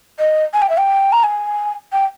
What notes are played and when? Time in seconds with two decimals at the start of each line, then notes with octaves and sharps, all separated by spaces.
0.19 D#5
0.54 G#5
0.62 G5
0.70 E5
0.78 G5
1.12 A#5
1.23 G#5
1.93 G5